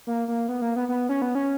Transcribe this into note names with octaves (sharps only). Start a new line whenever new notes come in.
A#3
A#3
B3
A#3
B3
B3
C#4
B3
C#4